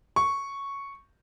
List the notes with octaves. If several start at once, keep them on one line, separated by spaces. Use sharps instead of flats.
C#6